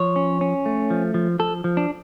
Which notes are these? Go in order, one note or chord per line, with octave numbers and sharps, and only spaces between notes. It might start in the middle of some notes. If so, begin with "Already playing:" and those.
Already playing: F3 C#5
C#4
C#4
A3
F3
F3
F3 A4
F3
D4